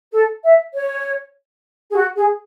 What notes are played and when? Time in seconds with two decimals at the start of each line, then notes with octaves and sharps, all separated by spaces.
0.12 A4
0.43 E5
0.74 C#5
1.91 G#4
1.96 F#4
2.17 G#4